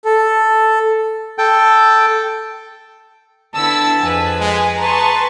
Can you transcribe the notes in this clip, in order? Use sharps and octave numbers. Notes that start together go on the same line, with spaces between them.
A4
A4 G5
D3 B3 E4 A5 E6
F2 G#4 B4 G#5
G#3
G#4 B4 A5 A#5 C6 C#6